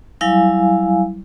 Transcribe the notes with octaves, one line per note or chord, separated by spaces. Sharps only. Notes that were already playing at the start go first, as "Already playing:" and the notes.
F#3 G3 E4 F5 G#5